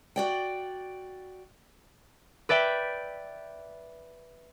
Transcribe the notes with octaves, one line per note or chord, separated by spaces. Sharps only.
F#4 D5 G5
B4 D5 E5 G5